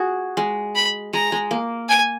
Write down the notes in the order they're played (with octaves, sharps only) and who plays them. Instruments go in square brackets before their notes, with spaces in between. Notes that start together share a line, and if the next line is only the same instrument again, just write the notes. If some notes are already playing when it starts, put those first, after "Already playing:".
Already playing: [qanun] F#4 G#4
G#3
[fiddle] B5
[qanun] G#3 [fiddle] A#5
[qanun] G#3
A#3
[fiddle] G#5